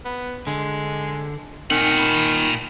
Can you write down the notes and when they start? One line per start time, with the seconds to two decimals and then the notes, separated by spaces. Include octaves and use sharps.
0.05 B3
0.47 D3 G#3
1.71 A#2 D#3 C4 F#5 G#5
1.98 A5 B5